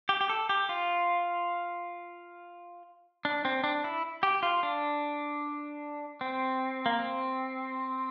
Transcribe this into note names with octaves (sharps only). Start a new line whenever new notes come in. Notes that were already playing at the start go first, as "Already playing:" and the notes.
G4
G4
A4
G4
F4
D4
C4
D4
E4
G4
F4
D4
C4
A#3
C4